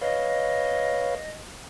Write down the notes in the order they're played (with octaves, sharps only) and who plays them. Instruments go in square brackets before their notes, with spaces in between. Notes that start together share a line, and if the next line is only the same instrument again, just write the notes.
[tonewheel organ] B4 C#5 F5 [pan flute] D#5